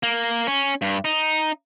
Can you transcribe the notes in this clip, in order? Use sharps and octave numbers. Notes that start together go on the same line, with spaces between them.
A#3
C#4
G2
D#4